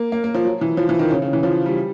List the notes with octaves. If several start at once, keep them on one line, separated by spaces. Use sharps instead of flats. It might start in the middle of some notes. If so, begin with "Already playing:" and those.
Already playing: A#3
A#3
A#3
F3
F#3
E3
F3
E3
D#3
C#3
C#3
E3
F3
G3